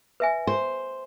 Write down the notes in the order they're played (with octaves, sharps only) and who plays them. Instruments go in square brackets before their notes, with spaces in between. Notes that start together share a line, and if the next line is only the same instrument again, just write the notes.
[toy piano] B4 E5 G#5
[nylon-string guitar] C5